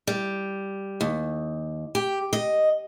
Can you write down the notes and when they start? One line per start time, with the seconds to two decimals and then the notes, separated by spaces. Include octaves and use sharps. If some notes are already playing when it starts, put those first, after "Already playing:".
0.07 G3
1.01 D#2
1.95 G4
2.33 D#5